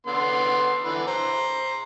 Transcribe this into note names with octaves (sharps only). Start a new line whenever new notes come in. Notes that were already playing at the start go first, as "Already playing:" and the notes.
D3 B3 C6
D3 E3 B4
C5 A#5